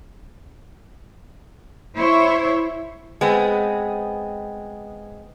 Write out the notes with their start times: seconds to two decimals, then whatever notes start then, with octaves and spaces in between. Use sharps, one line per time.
1.96 E4 C5 C#5 E5
3.21 G#3 B3 C4